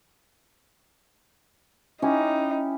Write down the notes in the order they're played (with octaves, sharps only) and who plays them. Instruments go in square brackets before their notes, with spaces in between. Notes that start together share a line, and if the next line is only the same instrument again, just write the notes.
[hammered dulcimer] C#4 E4 G4 [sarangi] D#4